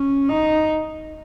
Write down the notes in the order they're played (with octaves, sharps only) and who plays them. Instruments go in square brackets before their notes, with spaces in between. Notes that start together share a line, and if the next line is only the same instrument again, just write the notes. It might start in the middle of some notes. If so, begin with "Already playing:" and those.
Already playing: [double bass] C#4
D#4